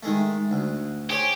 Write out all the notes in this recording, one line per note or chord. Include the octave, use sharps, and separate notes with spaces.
D#3 G#3 A3
D2
G4 G#4 C5 C#5